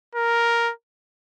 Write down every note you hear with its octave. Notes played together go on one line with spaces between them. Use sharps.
A#4